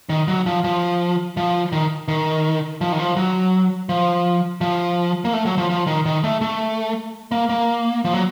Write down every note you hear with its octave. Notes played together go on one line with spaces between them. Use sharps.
D#3
F#3
F3
F3
F3
D#3
D#3
F3
D#3
F3
F#3
F3
F3
A#3
A3
F#3
F3
F3
D#3
D#3
A3
A3
A#3
A#3
F3
F#3